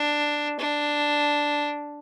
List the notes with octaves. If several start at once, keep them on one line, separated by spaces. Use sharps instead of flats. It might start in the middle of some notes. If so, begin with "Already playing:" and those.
Already playing: D4
D4